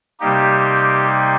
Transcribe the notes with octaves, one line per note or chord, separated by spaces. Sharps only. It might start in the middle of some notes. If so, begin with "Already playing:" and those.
C3 G3 A#3 D#4 G4